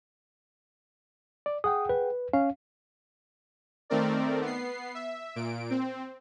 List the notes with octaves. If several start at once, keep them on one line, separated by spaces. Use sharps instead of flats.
D5
G#4 F#5 G5 D#6
B4
C#4 F5
D#3 A3 C4 A#4 D5
B3 C7
E5
A#2 D7
C4